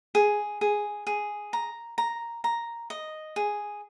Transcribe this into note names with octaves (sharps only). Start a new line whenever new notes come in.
G#4
G#4
G#4
A#5
A#5
A#5
D#5
G#4